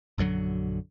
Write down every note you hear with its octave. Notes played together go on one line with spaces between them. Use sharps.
A#1 F#2 D3 F#3